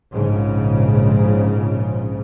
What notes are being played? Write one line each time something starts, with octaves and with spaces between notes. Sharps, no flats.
A#1 G#2 C#3